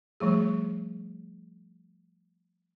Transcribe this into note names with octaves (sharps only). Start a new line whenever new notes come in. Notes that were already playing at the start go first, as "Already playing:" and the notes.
F3 G3 A3 G#4